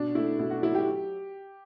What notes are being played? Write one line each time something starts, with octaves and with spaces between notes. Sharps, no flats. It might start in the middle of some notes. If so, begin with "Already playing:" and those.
Already playing: B2 D4
A3 E4
B2 E4
F#4
F#3 E4
G4